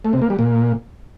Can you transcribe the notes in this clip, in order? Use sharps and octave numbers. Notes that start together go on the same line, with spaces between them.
A3
C3
A#3
G3
A#2